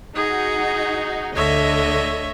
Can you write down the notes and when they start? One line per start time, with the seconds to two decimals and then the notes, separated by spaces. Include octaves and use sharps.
0.15 D#4 F#4 G#4
1.35 D2 D3 C#5 D#5 E5